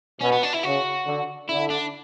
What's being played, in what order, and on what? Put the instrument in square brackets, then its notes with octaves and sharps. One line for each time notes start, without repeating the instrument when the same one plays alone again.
[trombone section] B2 [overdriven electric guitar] C#4
[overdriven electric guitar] B3
D4
E4
[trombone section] C#3 [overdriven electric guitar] F#4
[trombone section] D3
[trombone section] D3 [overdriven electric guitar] E4
[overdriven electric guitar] D4